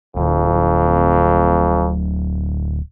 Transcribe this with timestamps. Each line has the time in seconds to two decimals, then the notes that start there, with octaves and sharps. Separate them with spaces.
0.16 D1 F2